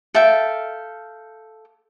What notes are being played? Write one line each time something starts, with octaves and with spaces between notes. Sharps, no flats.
A4 E5 F5 G5